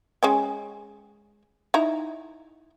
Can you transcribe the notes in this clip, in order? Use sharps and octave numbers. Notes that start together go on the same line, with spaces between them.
G#3 C#4 G5
D#4 E4 A#5